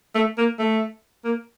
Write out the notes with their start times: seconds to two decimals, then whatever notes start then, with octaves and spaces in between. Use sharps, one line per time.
0.15 A3
0.38 A#3
0.59 A3
1.24 A#3